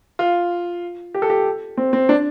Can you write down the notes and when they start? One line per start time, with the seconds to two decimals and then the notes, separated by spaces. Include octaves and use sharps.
0.19 F4
1.14 G4
1.22 A4
1.30 G4
1.77 C4
1.93 C4
2.09 D4